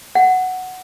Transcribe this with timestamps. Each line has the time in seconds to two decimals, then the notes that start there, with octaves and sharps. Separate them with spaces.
0.15 F#5